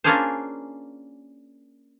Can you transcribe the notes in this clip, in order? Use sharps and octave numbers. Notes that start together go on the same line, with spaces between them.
A#3 C#4 D4 F4 G#4 C5